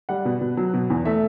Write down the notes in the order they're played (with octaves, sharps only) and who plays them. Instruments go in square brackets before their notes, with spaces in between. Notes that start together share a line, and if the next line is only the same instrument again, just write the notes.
[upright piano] G3 F#5
B2
B2
F#3
B2
E2
A3 E5